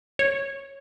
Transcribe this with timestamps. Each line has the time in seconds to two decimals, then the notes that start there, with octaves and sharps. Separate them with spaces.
0.19 C#5